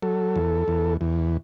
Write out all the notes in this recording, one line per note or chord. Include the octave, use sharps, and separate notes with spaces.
F#3 A4
E2
E2
E2